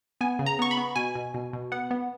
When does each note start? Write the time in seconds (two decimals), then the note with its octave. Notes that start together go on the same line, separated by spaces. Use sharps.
0.21 B3 G#5
0.39 C#3
0.46 A#5
0.59 B3 C#6
0.71 B5
0.77 B3
0.96 B2 G#5
1.15 B2
1.34 B2
1.53 B2
1.72 B3 F#5
1.91 B3